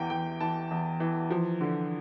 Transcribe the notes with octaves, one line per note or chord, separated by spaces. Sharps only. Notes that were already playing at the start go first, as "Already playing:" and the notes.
Already playing: E2 E3 G5
E2 G5
E3 A5
E2
E3
F3
D3